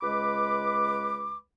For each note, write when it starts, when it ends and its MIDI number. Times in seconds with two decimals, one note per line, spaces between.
0.01 1.38 37
0.01 1.38 56
0.01 1.38 71
0.01 1.38 83
0.01 1.38 86